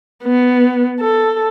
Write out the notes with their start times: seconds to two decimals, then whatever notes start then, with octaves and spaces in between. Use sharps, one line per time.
0.23 B3
1.01 A4